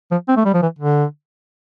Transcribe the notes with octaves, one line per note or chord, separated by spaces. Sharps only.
F3
C4
A3
G3
F3
E3
D3